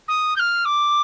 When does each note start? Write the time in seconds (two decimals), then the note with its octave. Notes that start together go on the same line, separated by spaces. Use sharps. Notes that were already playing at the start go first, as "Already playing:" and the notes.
0.08 D#6
0.36 G6
0.39 F6
0.65 D6